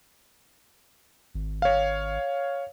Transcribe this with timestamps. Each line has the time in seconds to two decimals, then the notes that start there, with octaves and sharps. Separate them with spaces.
1.34 G#1
1.62 C#5 F5